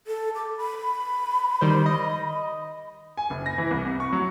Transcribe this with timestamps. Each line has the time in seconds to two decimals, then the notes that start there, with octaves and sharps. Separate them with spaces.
0.07 A4
0.35 D6
0.57 B5
1.61 D#3 G3 C5
1.86 D#5
3.17 G#5
3.30 F#1
3.46 A#6
3.58 E3
3.71 C2
3.85 C3
4.00 C#6
4.13 F#3